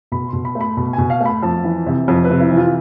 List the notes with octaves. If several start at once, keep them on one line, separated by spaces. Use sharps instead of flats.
B2 B5
C6
B2
B5
A3
B5
B2 B5
G#5
B2
F5
A3
B5
F2 A5
E3
C3
F2
B4
C3
E4
E3
F4